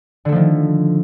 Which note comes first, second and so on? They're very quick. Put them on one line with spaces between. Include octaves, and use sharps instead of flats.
D3 A3 F3 D#3